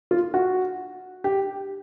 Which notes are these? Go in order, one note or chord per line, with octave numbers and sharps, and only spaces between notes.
F4
F#4
G4